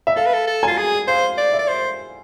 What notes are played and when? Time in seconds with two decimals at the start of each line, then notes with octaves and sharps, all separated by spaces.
0.07 E5
0.16 A4 F5
0.26 B4
0.34 A4
0.47 A4
0.63 F4 G#5
0.78 G#4
1.08 C5 F5
1.38 D5
1.53 E5
1.59 D5
1.68 C5